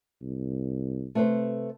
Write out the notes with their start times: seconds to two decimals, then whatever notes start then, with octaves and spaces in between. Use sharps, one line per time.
0.22 C2
1.15 C3 A3 B4 C5